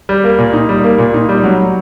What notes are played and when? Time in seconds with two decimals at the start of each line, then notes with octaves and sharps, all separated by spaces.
0.09 G3
0.24 A#3
0.39 A#2
0.53 D#4
0.69 G3
0.84 A#3
0.98 A#2
1.14 D#4
1.29 G3
1.44 F#3